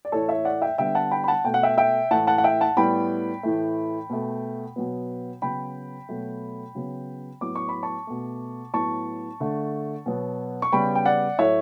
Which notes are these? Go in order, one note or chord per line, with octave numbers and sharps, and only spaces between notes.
D5
A2 E3 A3 A4 C#5
C#5 E5
D5 F#5
E5 G5
D3 G3 B3 E5 G5
F#5 A5
G5 B5
B5
F#5 A5
B2 A3 G5
F#5
E5 G5
E5 G5
A2 E3 A3 F#5 A5
F#5 A5
F#5
E5 G5
F#5 A5
A2 G3 B3 G5 B5
A2 E3 A3
B2 A3
B2 F#3 B3
C#3 F#3 B3 G5 B5
B2 F#3 A3
C#3 F#3 B3
A2 F#3 B3 D6
C#6
B5
A5 C#6
B2 A3
A2 F#3 B3 A5 C#6
D3 A3
B2 F#3 B3
C#6
C#3 G3 B3 G5 B5
G5
D5 F#5
A2 F#3 A3 C#5 E5